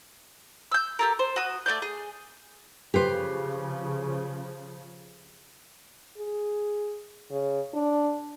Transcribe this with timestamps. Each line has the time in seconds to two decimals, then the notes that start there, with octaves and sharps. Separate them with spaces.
0.72 E6 G6
0.99 G4 A4 A#4
1.19 C5
1.36 F#4 D#6
1.66 A3 A#3 D5 G6
1.82 G#4
2.94 C#3 F3 G4 B4 C5
6.18 G#4
7.31 C#3
7.74 D4